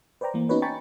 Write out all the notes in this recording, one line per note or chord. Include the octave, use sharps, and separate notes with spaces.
B4 C5 D5 G5 A#5
E3 A#3
B3 C#4 D#4 F#4 B4 C#5
G5 G#5 A#5 B5 C#6 A6